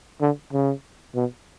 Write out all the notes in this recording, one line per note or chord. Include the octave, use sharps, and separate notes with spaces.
D3
C#3
B2